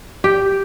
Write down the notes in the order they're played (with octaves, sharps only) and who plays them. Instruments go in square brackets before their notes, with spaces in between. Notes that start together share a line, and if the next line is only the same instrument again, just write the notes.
[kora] G4